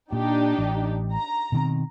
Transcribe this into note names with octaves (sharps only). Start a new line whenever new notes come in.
A#2 D4 D#4 G4
A1
A#5
B2 D#3 C4